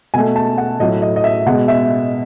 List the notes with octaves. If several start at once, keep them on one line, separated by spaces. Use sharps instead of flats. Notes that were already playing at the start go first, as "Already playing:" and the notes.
B2 A3 G#5
A5
F#5
A2 F#3 A3 D#5
D#5
D#5
E5
B2 G#3 B3 F#5
E5